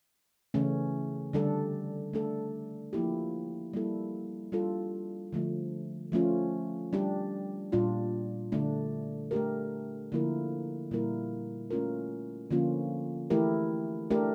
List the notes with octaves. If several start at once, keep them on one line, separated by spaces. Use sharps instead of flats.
C#3 E3 A3 C#4
D3 G3 D4 A4
A3 D4 A4
F3 A#3 E4 G4
G3 A#3 E4 A4
G3 D4 F4 A4
D3 F3 A3
F3 A3 C#4 F4
G3 D4 G4
A#2 G3 D4 F4
D3 A3 D4
A3 D4 G4 A#4
D3 F3 A#3 E4 A#4
A#2 G3 A#3 E4 A#4
A3 C#4 F4 A#4
D3 F3 A#3 C#4 F4
E3 A3 E4 G4 A#4
A3 D4 G4 A#4